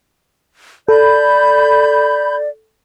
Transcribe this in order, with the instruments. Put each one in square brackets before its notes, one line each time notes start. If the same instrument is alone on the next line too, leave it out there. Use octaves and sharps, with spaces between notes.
[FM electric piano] A4 [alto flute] D5 [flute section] B5 G6